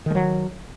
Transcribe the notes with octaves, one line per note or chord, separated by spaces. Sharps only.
D#3 F#3 G#3